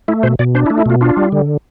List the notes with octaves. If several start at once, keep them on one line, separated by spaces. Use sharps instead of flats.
A3 E4
B2 C5
B2 D5
D4 C5
E4
A3
E4
B2 F4
D4 F4
G3
D3